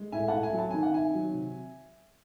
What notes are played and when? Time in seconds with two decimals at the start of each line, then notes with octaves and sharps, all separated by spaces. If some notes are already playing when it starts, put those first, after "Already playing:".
Already playing: G#3
0.12 A2 E5 G#5
0.28 A2 F#5 A5
0.43 E5 G#5
0.53 F#3
0.59 A5
0.71 D#3 G#5
0.83 F#5
0.94 D#3 E5 G#5
1.14 F#3
1.34 C3